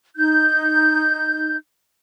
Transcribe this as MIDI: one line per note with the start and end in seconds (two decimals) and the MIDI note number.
0.16 1.56 63
0.16 1.56 91